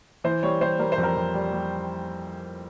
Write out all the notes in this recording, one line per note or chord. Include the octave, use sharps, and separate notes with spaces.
E3 C5
G3 C#5
G3 C5
G3 A#4
C5
F2
A#4
F2
G3
G3